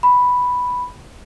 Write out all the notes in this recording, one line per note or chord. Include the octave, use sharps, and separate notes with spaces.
B5